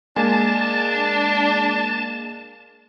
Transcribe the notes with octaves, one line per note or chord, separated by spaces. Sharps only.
G#3 A#3 D4 G#5 A5